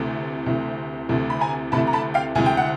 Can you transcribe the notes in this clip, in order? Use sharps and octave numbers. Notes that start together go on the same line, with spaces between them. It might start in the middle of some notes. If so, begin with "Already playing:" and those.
Already playing: D2 C3 E3 A3
D2 C3 E3 A3
D2 C3 E3 A3
B5
G#5 A#5
D2 C3 E3 A3 A5 B5
A#5
A5 B5
F5 G5
D2 C3 E3 G#3 G#5
G5
F#5